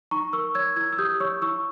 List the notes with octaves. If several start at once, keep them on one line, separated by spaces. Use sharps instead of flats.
D#4 A#5 C#6
A#4 C#6 E6
C#5 E6 G#6
E4 E6 G#6
E6
G4 D#6 G6
C#5 C#6 E6
E4 C#6 E6